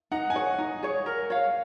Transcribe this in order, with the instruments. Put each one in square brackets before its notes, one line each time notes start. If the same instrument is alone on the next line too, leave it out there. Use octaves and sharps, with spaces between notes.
[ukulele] D#4 [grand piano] F#5
[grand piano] G#5
[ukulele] G#4 C#5 [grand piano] F#5
[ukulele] D#4
G#4 C#5
A#4
C#5 F5